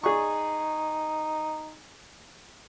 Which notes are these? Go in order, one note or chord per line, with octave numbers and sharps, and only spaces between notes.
D#4 G#4 D5 C#6